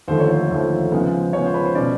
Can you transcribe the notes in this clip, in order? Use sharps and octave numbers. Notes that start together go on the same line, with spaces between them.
D#2 D3 F3 A3 C5
C#5
C5
D#2 D3 F3 A3
C#3 F3 G#3 B3
C#3 F3 G#3 B3 C#5
C5
B4
C5
B2 G#3 C#4 D5